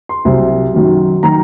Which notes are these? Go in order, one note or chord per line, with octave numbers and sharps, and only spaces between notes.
C6
C2 C3 F#3
F#2 D#3 F#3
D#3 F#3 A#5